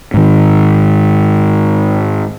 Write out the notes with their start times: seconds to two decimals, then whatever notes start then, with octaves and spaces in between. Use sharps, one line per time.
0.14 G#2 D#3